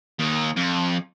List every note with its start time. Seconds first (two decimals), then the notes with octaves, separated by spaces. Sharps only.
0.19 D#2 D#3
0.57 F2